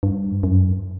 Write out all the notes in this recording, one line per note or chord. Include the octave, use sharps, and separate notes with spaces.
G2
F#2